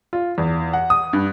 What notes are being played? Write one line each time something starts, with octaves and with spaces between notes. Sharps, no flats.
F4
E2
F#5
D#6
G2